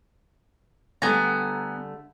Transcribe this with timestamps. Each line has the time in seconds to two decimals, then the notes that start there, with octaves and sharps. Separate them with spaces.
1.02 D3 G3 A3 B3 G#5 A#5